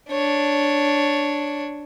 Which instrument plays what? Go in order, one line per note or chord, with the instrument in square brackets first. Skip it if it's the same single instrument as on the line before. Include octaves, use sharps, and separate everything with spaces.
[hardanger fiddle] D4 C#5